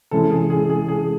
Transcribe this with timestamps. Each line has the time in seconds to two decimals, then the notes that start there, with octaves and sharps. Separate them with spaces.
0.11 C3 E3 G#3 C#4 E4 A4
0.31 G#4
0.50 G#4
0.70 G#4
0.88 G#4